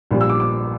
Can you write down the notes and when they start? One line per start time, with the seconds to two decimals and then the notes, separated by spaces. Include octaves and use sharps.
0.11 A#1 A#2 G3
0.21 E6
0.30 D6
0.40 D6